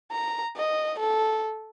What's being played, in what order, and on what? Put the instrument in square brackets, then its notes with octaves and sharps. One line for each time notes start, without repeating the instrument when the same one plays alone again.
[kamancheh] A#5
D#5
A4